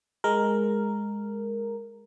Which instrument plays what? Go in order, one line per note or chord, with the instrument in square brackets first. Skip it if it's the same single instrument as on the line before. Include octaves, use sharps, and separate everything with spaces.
[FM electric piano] G#3 A#4